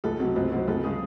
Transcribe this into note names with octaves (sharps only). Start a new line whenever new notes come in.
C#2 A4
C3 F#3
C#2 C5
C3 F#3 C5
C#2 A4
C#3 G#3 G#4